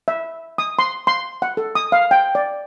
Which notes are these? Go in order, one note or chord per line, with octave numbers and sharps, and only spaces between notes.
E5
D#6
C6
C6
F#5
A4
D#6
F5
G5
D5